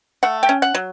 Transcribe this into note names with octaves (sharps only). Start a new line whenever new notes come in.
A3 F#5
G5
C#4
F#5
F#3